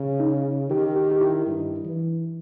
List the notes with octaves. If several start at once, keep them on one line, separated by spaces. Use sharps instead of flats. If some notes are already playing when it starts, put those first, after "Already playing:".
Already playing: C#3
D#4
D#3 G4
G4
G4
E4
G2
E3